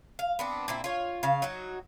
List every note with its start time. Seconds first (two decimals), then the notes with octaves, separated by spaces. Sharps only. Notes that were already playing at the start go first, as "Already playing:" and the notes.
0.19 F5
0.39 B3 C4 D4
0.68 A#2 C4 E4
0.84 F4 C#5
1.23 C#3 F5
1.42 F#3 D#4 F#4